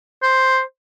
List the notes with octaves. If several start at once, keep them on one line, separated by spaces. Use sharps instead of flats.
C5